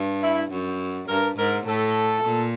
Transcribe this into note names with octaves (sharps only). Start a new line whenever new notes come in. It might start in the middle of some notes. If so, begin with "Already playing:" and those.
Already playing: G2
E4
F#2
G2 A#4
G#2 A#4
A2 A4
A#2